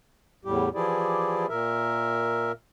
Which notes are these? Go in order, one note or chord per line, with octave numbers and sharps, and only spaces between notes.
E2 A2 G3 G4
E3 F3 E4 G4 G#4 D5
A#2 A#4 E5